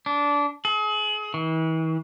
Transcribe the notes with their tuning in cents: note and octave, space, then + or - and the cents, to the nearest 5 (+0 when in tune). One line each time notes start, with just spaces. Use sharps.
D4 -20
G#4 +35
E3 -40